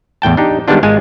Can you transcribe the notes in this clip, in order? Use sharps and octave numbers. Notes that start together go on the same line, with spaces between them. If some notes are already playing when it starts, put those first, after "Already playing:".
E2 A2 G5 A5
D4 D#4 G4
D#3 G3 G#3 B3 D4 F4
G#1 G#3 F4 G#5